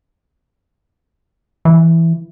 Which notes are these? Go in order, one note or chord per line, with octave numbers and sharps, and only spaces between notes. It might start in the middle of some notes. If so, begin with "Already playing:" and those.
E3